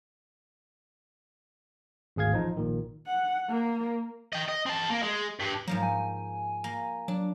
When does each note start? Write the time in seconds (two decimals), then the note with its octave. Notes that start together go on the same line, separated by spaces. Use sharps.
2.16 G#1 D2 G#4 F5 G#6
2.32 A1 F3 D#4
2.57 A#1 A#2 D#3
3.07 F#5
3.50 A#3
4.33 D#5 G5
4.49 D#5
4.66 C4 A5
4.90 A#3
5.03 G#3
5.40 G2
5.68 G#2 F3 F#3 A#3
5.83 G#5
6.64 A#3
7.08 F#3 D4